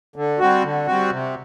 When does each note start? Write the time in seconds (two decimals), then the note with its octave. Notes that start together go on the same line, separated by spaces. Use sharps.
0.16 D3
0.39 G3 C4 F#4
0.63 D3
0.87 G3 C4 F#4
1.11 C3